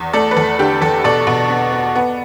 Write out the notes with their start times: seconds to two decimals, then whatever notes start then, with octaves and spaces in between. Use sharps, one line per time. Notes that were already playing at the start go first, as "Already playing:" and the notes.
Already playing: E2
0.13 A3 A4 D5
0.31 B4
0.37 E2 A4
0.59 D3 G4
0.82 E2 A4
1.04 B2 A4 D5
1.27 B2
1.50 B3
1.72 B3
1.96 B3